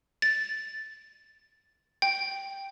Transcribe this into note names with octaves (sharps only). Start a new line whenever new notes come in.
A6
G5